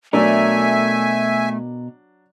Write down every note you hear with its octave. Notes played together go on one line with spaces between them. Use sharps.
B2 F#3 A3 D4 A#4 E5 G#5